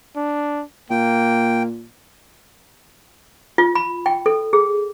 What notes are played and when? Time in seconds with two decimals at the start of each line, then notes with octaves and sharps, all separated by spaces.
0.16 D4
0.90 A#2 A#3 G5
3.58 F4
3.75 B5
4.06 G5
4.26 A4
4.53 G#4